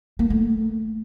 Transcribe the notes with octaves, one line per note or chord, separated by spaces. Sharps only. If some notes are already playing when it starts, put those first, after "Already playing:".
A#3
A3